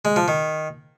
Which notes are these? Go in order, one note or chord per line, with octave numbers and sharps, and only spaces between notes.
G#3
F3
D#3